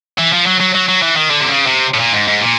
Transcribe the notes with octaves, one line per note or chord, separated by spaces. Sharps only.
E3
F3
F#3
F#3
F#3
F#3
E3
D#3
D3
C3
C#3
C3
A2
A#2
G#2
G#2
A#2